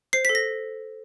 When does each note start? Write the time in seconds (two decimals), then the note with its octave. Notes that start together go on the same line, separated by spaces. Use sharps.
0.13 C5 C7
0.25 A4 B6
0.35 A#6